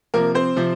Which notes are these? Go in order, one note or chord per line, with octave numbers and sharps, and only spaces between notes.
C3 F3 A#3 A#4
C4 C5
C3 F3